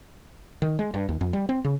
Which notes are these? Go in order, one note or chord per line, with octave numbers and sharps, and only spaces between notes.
D#3
G#3
G2
D#2
F2
G3
C4
C#3